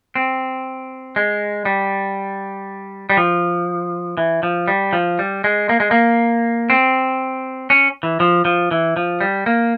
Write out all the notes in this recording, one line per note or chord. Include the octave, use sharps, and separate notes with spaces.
C4
G#3
G3
G3
F3
E3
F3
G3
F3
G3
G#3
A#3
G#3
A#3
C4
C#4
E3
F3
F3
E3
F3
G3
A#3